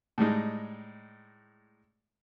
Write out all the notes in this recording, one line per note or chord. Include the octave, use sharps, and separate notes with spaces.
A2 G3 G#3 D#4